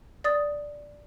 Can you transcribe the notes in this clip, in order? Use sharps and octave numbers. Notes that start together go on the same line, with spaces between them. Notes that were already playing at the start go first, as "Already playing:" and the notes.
D5 D#6 A6